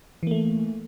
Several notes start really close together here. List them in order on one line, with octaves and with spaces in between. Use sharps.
E3 A#3 A3